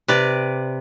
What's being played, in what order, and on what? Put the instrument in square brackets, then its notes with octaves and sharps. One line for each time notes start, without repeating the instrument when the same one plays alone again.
[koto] C3 B4 D5